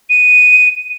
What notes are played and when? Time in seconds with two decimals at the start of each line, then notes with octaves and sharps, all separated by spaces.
0.10 D#7